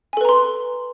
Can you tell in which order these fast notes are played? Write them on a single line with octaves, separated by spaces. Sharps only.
G#5 A4 B4 A#5 C6